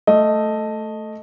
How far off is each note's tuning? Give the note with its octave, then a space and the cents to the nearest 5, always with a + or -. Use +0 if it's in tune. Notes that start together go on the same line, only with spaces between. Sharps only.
A3 +0 D#5 +0